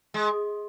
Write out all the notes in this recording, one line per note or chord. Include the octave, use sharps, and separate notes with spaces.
G#3